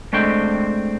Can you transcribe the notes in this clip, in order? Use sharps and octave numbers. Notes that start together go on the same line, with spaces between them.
G#3 A3 C4 D4 G5